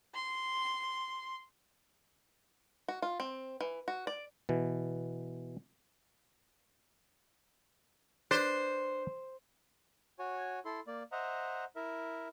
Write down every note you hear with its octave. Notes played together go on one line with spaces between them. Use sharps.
C6
F#4
F4
C4
E3
F#4
D5
B2 E3
D4 B4 C5
F#4 C#5 G#5
E4 A4 C6
A#3 D5
C5 D#5 E5 F#5 A#5
E4 A#4 E5